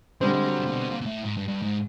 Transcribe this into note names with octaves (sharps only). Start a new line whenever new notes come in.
D3 G3 G#3 C4
G#3
F#3
C3
A#2
B2
A#2
A#2
A2
G#2
G2
G2
G#2